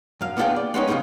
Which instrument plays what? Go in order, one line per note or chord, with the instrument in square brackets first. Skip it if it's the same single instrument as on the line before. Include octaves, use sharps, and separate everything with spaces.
[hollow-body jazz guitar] F#2 F5
B3 D4 E4 F4 G#4 G5
D5
G#3 B3 C#4 D#4 G4
C#3 F3 G3 G#3 C4 D#4